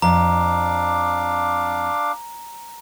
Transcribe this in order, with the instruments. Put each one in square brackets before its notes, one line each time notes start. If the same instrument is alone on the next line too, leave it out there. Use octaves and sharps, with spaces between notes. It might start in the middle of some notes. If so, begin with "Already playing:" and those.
[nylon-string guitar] F2 [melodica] D4 F5 D6 [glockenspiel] A#5